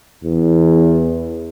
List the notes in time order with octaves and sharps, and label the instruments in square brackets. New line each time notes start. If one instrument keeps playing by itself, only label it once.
[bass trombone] E2